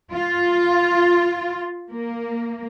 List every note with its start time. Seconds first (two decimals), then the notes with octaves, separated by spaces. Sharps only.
0.12 F4
1.89 A#3